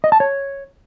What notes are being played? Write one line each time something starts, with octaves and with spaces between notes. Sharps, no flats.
D#5
A5
C#5